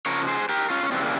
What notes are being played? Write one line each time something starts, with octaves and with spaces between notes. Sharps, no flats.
C#3 F3 A#4 C#5
G#4 C5
G4 A#4
C#4 F4
C#4
C#3 E3 G3 C4
A#3